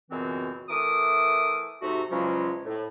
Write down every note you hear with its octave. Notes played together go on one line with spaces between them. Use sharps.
C#2 F#2 B2 E3 C4
E3 A3 A#4 D6 D#6
G#2 C3 A3 D#4 F#4
E2 C#3 F3 F#3 G#3 C#4
A2